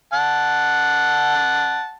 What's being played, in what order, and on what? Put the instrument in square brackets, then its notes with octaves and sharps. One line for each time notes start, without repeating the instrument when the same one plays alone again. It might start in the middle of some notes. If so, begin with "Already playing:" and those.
[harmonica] F#5 A5